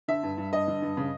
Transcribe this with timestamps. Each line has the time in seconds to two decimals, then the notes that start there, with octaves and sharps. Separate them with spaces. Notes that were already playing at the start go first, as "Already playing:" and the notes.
0.08 D3 E5
0.23 G2
0.38 G2
0.52 G2 D#5
0.67 D3
0.82 G2
0.97 C#3